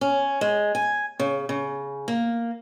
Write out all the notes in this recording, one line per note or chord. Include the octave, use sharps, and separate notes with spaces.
C#4
G#3
G#5
C#3
C#3
A#3